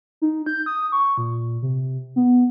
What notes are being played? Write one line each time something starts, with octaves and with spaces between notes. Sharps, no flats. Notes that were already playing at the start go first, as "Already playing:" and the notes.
D#4
G6
D#6
C#6
A#2
C3
B3